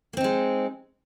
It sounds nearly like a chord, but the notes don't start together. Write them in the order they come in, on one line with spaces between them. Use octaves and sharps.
A#3 C4 D#4 G#3